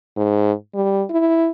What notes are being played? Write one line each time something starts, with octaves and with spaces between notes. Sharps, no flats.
G#2
G3
E4